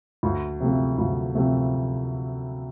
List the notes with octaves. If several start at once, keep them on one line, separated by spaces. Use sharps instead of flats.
D2
C3 F3 A3
D2
C3 F3 A3